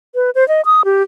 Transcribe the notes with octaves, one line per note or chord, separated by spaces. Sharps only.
B4
C5
D#5
D#6
G4